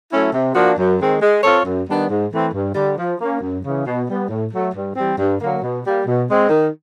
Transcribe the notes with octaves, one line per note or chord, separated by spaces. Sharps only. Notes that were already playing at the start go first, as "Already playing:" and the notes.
F#3 A3 C#4 E4
C3
F3 A#3 D4 F#4
F#2
D#3 G#3 C4
G#3
C4 F4 A4 C#5
F#2
D#3 G3 B3 D4
G#2
E3 A3 C4
G2
D3 G3
F3
A#3 C#4
F#2
C#3 E3
B2
G3 B3
A2
F#3 A3
G2
E3 G3 C4
G2
D3 F#3 A#3
B2
G3 A#3
B2
G#3 C4
D#3